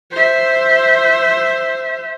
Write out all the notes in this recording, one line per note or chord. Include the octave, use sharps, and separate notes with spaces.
C5 E5